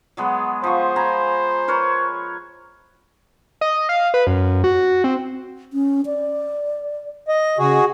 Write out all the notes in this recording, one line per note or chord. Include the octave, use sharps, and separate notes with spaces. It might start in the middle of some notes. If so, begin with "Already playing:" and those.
F#3 G#3 B3
F3 C5 C#6
G#5 A#5 B5
A#4 B4 C#5
D#5
F5
B4
F#2
F#4
C4
C#4
D5
D#5
C#3 F#4 G#4